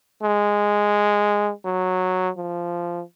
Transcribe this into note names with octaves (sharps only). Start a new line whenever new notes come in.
G#3
F#3
F3